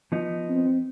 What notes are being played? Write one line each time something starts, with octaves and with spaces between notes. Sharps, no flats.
F3 B3 D#4
C4